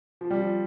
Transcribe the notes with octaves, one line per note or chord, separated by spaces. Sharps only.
F3
G3
F3